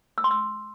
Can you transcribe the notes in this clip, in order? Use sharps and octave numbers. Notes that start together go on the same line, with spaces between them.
E6
C6
E6